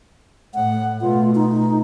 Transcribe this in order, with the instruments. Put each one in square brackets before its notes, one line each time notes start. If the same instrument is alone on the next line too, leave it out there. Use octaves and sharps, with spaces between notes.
[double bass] A2 [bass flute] F#5
[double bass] B2 A3 [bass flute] F4
[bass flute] D#4